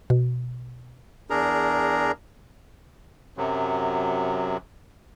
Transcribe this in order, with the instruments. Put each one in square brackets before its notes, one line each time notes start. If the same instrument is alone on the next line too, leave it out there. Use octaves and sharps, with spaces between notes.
[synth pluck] B2
[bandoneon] E2 D4 G#4 A#4 A#5
F#2 C3 F#3